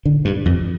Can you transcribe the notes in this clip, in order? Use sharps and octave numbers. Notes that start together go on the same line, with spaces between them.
D3
G2
F2